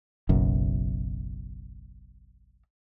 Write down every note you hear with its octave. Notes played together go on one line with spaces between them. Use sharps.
F#1 B1 F#2